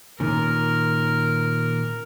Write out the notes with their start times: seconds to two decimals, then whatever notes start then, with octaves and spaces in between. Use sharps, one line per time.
0.20 A#2 D#3 C#4 A#4